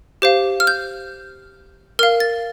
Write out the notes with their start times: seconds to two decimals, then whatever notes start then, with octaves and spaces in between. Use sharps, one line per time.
0.22 G4 C5 F5
0.60 F6
0.67 G6
1.99 A#4 F5 F6
2.20 A6